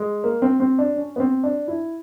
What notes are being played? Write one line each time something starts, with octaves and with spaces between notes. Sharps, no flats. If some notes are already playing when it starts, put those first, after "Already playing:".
Already playing: G#3
A#3
C4
C4
D4
C#4
B3
C4
D4
E4